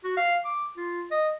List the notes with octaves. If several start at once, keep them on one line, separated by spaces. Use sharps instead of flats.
F#4
F5
D6
F4
D#5